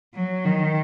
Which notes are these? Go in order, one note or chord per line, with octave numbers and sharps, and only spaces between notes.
F#3
D#3